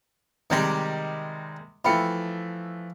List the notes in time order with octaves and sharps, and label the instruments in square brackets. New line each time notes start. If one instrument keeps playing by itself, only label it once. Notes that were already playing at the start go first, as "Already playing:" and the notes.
[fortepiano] C3 G3 G#3 [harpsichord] D#3 G4
[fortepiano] E3 A3 F4 [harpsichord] F3 [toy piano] G5 B5